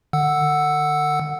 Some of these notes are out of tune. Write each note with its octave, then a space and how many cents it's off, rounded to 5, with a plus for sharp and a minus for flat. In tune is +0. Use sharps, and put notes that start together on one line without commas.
D3 +40 F#5 +0 E6 +0